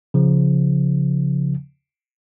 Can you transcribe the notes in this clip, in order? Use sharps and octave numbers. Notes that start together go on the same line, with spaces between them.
C#3 F3